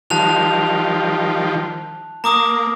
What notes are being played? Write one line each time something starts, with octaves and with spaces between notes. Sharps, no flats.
D#3 F3 G3 A5 F#6 F7
A#3 A#5 D6 D#6